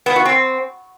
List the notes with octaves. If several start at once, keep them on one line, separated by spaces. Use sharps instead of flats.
B3
F#4
C4